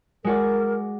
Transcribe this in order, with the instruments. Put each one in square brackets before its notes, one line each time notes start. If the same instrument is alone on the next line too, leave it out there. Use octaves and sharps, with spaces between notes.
[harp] G#3 F#4 D5 [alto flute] A#4